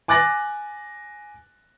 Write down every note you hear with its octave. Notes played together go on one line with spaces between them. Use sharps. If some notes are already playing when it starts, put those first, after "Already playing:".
G#5 D6 F#6 A6 A#6 F#7